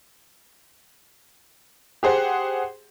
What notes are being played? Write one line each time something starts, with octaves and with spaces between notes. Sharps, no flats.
G4 G#4 C5 F#5